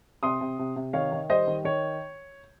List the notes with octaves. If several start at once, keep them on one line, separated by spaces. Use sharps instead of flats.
C3 C6 D#6
C3
C3
C3
D#3 C#5 F5
D#3
G3 C5 D#5
D#3
D#3 C#5